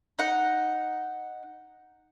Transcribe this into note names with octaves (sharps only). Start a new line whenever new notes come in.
D#4 F#5